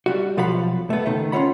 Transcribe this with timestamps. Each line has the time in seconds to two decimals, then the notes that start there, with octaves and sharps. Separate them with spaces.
0.06 G3 F#4
0.37 B1 F3 F#4 F5 F#5 B5
0.90 A3 B3
1.06 C#2 D#3 A3
1.32 C#4 F4 A#4 C#5 F#5 B5